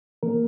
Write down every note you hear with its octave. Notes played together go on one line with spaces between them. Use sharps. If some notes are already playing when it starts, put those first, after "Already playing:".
E3 A#3 A#4